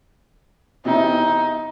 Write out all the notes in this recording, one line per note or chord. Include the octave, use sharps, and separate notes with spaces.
E2 C3 D#4 E4